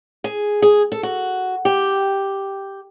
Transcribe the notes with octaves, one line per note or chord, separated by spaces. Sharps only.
G#4
G#4
A4
F#4
G4